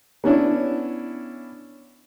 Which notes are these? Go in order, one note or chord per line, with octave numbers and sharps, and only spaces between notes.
B3 C#4 D4 E4